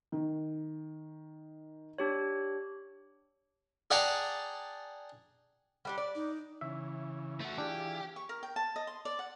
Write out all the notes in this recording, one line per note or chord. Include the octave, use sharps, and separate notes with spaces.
D#3
D4 G4 C#5
G#4 D5 F#5 G5 A5 A#5
G3 D4 G4
D5
D#4
C#3 E3 E5
A3 F#4
E3 D4 F4 G4 G#4
C#6
A#4
G5
A5
D#5
C6
D5
F#5